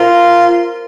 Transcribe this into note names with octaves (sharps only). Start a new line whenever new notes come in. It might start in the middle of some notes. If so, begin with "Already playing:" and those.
Already playing: F4 A#4 C5